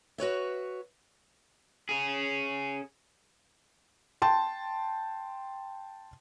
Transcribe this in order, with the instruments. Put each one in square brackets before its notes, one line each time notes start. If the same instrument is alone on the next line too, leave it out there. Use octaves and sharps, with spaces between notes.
[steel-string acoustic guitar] F#4 B4 C#5 E5
[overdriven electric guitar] C#4 G#4
[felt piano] G5 A5 C6